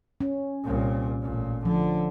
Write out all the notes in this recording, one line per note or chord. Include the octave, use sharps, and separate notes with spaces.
C#4
C2 A#2
A1 A#2
D3 F3